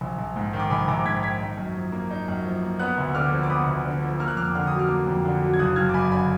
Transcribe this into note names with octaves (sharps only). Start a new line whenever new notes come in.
A#1
A#1
G#2
D#3
D6
A#1 G#5 B5
A#1 A#5 D6
G#2 G#6 B6
D#3 G#6 B6
D#4
F#2
F3
A#3
D#4
F#2
F3
A#3
B3 D#6 F#6
D2
D3 D6 F6
F3
D6
B3 B5 D#6
D2
D3
F3
A#3 F6
F#6
F2 D6 F6
D3 F6
F#3 D#6
D6 F6
A#3
F2
D3
F#3
G#6
F#1 D#6 F#6
F#1 F6 G#6
D6
F#2 G#5 B5
D3 G#5 B5